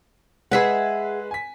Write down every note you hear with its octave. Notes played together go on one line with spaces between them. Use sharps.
G#3 G#4 B4 E5 F#5
G#5 B6